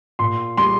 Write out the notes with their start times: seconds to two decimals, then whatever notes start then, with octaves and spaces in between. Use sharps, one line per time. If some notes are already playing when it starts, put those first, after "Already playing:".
0.19 A#2 C6
0.57 G3 C6